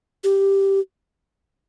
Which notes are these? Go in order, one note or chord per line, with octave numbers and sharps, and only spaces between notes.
G4